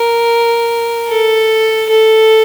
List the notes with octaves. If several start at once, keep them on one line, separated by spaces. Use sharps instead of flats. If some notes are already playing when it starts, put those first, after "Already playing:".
Already playing: A#4
A4
A4